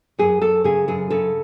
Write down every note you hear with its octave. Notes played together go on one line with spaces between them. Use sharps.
F#2 G#4
F#2 A4
C#3 G#4
F#2 G#4
C#3 A4